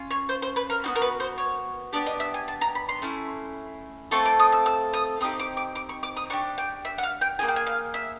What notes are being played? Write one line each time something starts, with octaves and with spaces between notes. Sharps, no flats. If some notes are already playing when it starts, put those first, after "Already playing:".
Already playing: C#4 F4
C#5
C5
C5
B4
A#4
B3 D#4 F#4
A#4
B4
C5
C#5
B3 D4 G4 D5
D#5
E5
G#5
A5
A#5
B5
C6
A3 C#4 E4
A3 C4 F4 A4 C#6
D6
D#6
E6
E6
D#6
C4 D#4 G4 D#6
D6
D6
D6
C#6
D6
D#6
D4 G4 C#6
G5
E5
F#5
F5
G5
A#3 D#4 G#4 G#5
G5
G#5
F5
E5